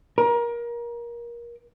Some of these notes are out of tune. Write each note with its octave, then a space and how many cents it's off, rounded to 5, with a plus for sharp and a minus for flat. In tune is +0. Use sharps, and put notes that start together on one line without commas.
A#4 +25